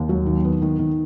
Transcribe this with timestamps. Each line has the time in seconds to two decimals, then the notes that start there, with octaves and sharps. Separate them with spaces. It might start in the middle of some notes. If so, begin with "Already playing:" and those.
Already playing: D#2
0.09 F#3
0.26 D#3
0.44 B3
0.62 D#3
0.79 D#3